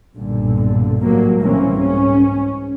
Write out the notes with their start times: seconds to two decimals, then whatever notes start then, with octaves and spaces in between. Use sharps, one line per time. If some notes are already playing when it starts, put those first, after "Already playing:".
0.16 B1 G2 A#2 D3
1.02 A2 C3 F#3 G3 A#3
1.39 C2 B2 E3 A#3 C4 C#4
1.76 G#2 C#4